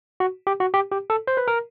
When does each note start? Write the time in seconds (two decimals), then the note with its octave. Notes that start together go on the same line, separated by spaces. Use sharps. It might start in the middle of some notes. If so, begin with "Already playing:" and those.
0.20 F#4
0.47 G4
0.60 F#4
0.74 G4
0.92 G4
1.10 A4
1.27 C5
1.37 B4
1.48 A#4